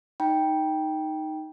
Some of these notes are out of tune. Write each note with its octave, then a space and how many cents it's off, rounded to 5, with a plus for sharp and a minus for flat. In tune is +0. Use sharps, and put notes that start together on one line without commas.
D#4 +0 G5 +0 B5 -40